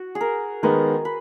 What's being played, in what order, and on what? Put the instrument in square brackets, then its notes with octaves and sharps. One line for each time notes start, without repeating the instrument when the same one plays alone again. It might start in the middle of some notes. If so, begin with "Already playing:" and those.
Already playing: [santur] F#4
G#4
A#4
[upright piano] D#3 G#3 B3 [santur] A#4
[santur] B4